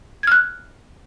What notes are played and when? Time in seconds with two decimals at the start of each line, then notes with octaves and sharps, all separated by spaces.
0.23 G#6
0.27 F6
0.32 F#6